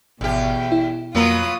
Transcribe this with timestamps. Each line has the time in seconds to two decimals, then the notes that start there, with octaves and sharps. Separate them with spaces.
0.21 G#1 E2 B2 G4
0.72 E4
1.15 F2 F#3 A#3 B3 F4 A#5 D#6